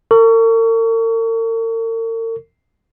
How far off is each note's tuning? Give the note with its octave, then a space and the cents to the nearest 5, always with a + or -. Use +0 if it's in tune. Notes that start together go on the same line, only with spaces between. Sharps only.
A#4 -45 C#6 +30